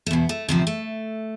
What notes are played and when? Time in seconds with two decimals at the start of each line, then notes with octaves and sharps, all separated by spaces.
0.06 A3
0.11 E2 B2 B3
0.29 A3
0.48 D2 C3 F3 C4
0.67 A3